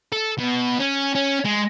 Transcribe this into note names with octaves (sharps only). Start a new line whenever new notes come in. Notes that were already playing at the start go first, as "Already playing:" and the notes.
A4
B2
C#4
C#4
G#3